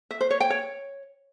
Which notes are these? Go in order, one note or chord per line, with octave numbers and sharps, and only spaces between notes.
E5
C5
C#5
G5
C#5